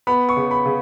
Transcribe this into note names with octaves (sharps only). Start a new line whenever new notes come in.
B3 B5
C#6
C#3
B5
C#3